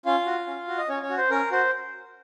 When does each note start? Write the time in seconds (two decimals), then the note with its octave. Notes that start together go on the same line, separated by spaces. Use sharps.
0.06 C#4 F4 F5
0.26 F#4
0.47 C#4
0.68 F#4
0.78 D#5
0.89 C#4 C#5
1.02 C#4 C#5
1.10 F#4
1.17 C5
1.30 C#4 A#4
1.51 F#4 C5